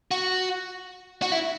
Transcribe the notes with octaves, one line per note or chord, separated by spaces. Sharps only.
F#4
F#4
E4